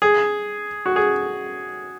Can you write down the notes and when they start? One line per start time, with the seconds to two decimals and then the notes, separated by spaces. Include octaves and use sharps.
0.02 G#4
0.86 F#4
0.96 G#4